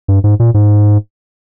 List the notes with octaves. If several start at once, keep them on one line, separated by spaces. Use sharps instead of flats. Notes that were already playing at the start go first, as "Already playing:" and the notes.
G2
G#2
A#2
G#2